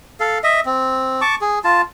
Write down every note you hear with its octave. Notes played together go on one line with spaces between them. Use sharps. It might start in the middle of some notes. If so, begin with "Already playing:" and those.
A4 F5
D#5 E5
C4
A5 C#6 D6
G#4
F4 A5